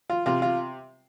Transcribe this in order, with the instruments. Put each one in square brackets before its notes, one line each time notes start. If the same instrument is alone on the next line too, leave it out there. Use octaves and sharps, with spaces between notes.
[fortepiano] F4
C3 F4
F4